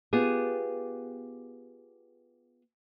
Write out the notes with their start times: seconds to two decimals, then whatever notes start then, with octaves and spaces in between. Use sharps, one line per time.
0.13 B3 F4 G4 G#4